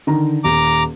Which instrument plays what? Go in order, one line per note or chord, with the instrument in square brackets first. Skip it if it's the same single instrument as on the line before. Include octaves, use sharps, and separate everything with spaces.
[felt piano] D3 D#3 A#5
[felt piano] D#1 [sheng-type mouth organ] A#5 D6